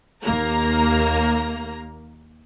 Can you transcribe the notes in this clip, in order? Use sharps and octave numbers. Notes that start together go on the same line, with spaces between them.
D#2 A#3 A#5